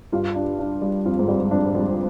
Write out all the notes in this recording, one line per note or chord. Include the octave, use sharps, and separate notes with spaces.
G2 F4
D4
D4
G3
F2 F4
G#2
G2 G3
F2 D4
F2 G3